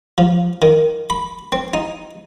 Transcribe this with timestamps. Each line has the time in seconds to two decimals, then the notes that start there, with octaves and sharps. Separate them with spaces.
0.18 F3
0.62 D#3
1.10 B5
1.52 C4
1.74 D#4